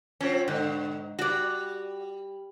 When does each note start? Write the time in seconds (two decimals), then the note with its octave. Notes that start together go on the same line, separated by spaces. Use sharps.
0.21 F3 F#3 C4 C#4
0.48 G#2 B2 D3
1.19 G3 F#4 D5